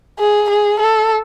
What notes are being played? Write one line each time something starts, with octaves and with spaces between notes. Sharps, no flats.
G#4
G#4
A4